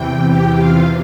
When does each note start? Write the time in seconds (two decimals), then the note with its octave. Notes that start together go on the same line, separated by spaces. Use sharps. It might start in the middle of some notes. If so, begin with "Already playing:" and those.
Already playing: E2 C3 E3 G5
0.31 G4 G5
0.59 F4 F5